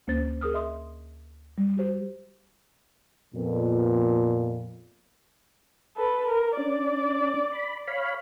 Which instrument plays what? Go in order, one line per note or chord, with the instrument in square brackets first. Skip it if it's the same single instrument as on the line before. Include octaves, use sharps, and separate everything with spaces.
[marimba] D2 A#3 C#4 C5 A6
G#4 A#4 D#6 F6
D#5 E5 C6 D#6
G3
F#4 G4 C5
[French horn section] F2 A#2 B3
[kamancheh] A4 B4
A#4
[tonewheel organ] C#4 D4 [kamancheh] D5
[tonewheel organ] B5
C#5 F5 B5